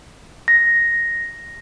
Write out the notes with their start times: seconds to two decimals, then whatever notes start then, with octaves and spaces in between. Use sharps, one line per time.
0.48 A#6